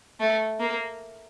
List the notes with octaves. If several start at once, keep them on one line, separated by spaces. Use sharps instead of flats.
A3
A#3